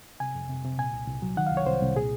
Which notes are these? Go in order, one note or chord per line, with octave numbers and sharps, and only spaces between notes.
C3 G#5
F2
C3
C3
A#2 G#5
C2
C2
F#3
D#3 F#5
F5
C2
C#5
C2 C5
C2
A#2 G#4